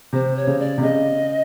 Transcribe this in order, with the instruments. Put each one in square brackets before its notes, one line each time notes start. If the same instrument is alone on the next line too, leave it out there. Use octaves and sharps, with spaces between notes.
[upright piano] C3 [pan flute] C5
[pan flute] C#5
[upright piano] C#3
[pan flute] D5
[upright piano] C3
[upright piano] C#3 [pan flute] D#5